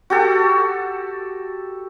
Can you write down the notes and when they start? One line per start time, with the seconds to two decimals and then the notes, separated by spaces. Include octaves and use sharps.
0.10 F#4 G4 A4